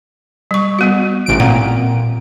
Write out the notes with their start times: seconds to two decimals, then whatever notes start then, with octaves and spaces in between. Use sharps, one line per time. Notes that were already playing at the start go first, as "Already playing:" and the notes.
0.51 G3 C#6
0.79 G3 B3 F#4
1.26 A1 D7
1.40 A#2 C4 F#5 A#5